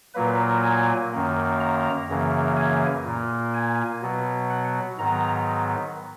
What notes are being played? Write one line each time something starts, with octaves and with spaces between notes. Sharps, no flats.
A#2 F#3 A#3 B4
G#5
F#2 D#3 A#3
A#5
F#2 C#3 E3 A#3
G#5
A#2 A#3
G#5
B2 F#3 B3
F#5
G#2 D#3 F#3 B3 A#5